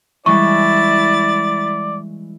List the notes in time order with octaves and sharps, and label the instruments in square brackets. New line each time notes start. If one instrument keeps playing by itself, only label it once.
[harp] E3 G3 G#3 [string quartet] E4 A6 [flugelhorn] D5 [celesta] C#6